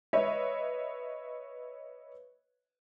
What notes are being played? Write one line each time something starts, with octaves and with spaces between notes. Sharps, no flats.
B4 C#5 D#5 E5